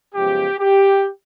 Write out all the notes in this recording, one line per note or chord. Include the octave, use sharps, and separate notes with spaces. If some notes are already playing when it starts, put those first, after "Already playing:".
F#2 C#3 F3 G#3 B3 G4
G4